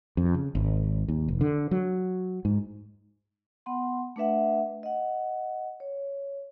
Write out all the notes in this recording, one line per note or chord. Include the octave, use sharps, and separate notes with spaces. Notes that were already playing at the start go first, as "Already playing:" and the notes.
F2
C#3
G#1
D#2
F1
D3
F#3
G#2
B3 F#5 C6
A3 D4 B4 E5 F#5
D#5 F#5
C#5